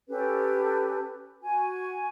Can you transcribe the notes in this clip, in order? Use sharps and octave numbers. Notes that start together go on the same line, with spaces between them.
C#4 G4 A4 B4
F#4 G#5